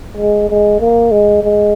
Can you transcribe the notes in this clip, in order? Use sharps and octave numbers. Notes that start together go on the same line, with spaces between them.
G#3
G#3
A#3
G#3
G#3